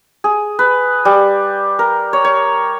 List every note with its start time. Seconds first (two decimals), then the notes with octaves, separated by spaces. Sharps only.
0.24 G#4
0.59 B4
1.05 G3
1.79 A#4
2.13 C#5
2.25 C#5